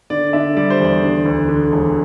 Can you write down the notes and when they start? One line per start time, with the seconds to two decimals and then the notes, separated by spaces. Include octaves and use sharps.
0.10 D3 D5
0.33 D3 E5
0.56 G3 D5
0.70 C5
0.80 E2 D5
1.02 D3
1.26 D2
1.49 D3
1.72 E1